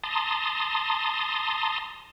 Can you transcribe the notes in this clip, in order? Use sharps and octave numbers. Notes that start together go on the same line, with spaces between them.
A5 A#5 C6 D#6